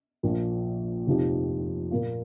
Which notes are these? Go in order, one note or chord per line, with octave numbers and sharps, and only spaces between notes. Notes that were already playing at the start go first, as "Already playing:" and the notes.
A#1 A#2 F3
F1 F2 F3 D#4 G4
A#2 A#3 F4